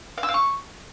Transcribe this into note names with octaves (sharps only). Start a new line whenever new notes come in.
F5
E6
F5
C#6